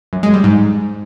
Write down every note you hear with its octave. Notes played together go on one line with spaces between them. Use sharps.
F#2
G#3
G3
G#2